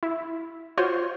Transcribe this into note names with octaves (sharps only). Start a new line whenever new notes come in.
E4
F4 F#4 C5 C#5 C6